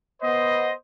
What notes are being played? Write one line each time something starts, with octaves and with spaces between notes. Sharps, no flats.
B3 C5 D#5